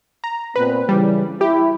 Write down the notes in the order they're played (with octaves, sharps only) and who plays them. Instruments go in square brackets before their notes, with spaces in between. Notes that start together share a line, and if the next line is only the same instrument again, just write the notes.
[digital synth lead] A#5
[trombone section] A#2 B3 C4 [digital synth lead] B4
[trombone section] C#3 E3 [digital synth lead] G3
[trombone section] E4 [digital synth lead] G4